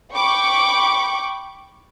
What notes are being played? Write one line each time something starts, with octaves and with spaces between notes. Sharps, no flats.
G5 B5 C#6 D6